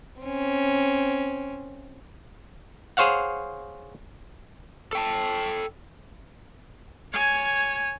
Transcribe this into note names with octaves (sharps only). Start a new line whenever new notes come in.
C4 C#4
G#4 C5 C#5 F5 F#5
A4 G5 A5
C#5 G#5